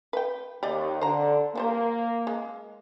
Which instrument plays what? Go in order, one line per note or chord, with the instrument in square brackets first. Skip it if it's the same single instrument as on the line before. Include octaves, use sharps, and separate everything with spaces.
[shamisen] B4 G5
[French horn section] D#2 [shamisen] G4 D5 D#5
[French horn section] D3 [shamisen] C5 A#5
[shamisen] F3 G3 C5 [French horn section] A#3
[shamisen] G#3